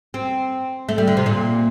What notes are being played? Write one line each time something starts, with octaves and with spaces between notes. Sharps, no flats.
C4
A3
G3
D3
C3
A#2